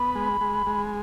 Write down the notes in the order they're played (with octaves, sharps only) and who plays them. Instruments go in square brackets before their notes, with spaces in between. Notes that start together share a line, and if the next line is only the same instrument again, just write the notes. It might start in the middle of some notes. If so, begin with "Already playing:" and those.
Already playing: [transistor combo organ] B3 [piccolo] B5
[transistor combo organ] G#3
G#3
G#3